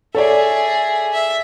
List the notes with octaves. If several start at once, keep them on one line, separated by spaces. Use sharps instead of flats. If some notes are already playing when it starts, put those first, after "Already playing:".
G#4 A4 C#5 D5 E5
E5